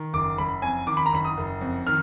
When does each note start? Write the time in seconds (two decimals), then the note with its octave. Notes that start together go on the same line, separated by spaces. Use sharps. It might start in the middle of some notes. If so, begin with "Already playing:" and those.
Already playing: D#3
0.13 F#1 D6
0.38 F#1 B5
0.62 F2 G#5
0.87 D#3 D6
0.97 B5
1.06 A#5
1.12 F#1 B5
1.25 D#6
1.37 F#1
1.61 F2
1.87 D#3 F6